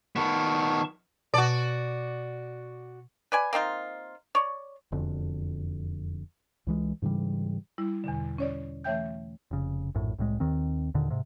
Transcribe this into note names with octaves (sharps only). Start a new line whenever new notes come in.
D#3 B3 A5 C#6
B2 F#4 D5 A5
B4 D5 G#5
A#3 C4 D#4 F4
C#5 D5
E1 F2 D3
C#2 E3 G#3
G#2 C#3 E3 G3
G3 E4
E2 B2 D3
C#4 C#5 D5
E3 A3 C#5 E5 G5 G6
F1 C#3
A#1 F#2 A2
C2 A2 G#3
D#2 D#3 C4
D#2 A#2 D3 D#3
G#2 C3